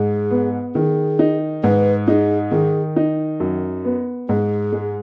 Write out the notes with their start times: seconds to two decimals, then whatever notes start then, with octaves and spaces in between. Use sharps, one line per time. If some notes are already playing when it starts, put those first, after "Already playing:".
Already playing: G#2 G#4
0.31 B3
0.75 D#3 G#4
1.19 D#4
1.63 G#2 B4
2.07 D#4 G#4
2.52 D#3 G#4
2.96 D#4
3.40 F#2
3.85 B3
4.29 G#2 G#4
4.72 G#3